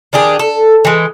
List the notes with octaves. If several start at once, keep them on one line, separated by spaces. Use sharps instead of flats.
D#3 D4 G4 G#4
A4
E3 G#3